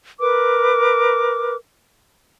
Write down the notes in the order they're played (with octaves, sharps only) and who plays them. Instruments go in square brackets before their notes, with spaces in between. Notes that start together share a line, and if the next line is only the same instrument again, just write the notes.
[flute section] A#4 B4 D6